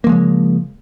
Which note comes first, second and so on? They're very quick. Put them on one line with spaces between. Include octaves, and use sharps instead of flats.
A#3 F3 G#3 C#3